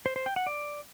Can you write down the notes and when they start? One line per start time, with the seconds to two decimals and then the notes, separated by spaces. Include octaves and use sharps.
0.06 C5
0.16 C5
0.26 G5
0.36 F#5
0.47 D5